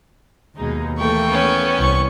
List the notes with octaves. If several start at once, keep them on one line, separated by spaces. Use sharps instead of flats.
D#2 B2 G#3 D#4
E3 A3 A#3 G5 C#6
B3 C#4
C2 C#6